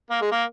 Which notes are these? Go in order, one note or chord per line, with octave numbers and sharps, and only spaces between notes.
A#3
G#3
A#3